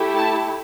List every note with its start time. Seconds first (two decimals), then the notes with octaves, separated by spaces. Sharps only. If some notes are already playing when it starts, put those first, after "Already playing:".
Already playing: A3 E4 G4
0.16 A5